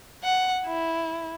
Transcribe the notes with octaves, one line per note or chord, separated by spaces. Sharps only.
F#5
E4